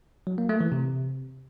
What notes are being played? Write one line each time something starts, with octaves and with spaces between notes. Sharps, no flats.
F#3
A#3
A3
E3
C3